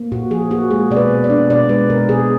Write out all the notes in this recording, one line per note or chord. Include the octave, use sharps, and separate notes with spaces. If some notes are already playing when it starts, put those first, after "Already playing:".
Already playing: A#3
A#2 F#4
F3 G#4
A#3 F#4
G#3 G#4
B2 D5
B4
B2
D5
D4
B2 D5
G#3 B4
B2 A#4
B2 G#4